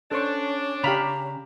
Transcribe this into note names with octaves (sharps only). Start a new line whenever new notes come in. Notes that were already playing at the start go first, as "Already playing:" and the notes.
C#4 D4 A4 C5 C#6
C#3 G4 F5 A#5 B5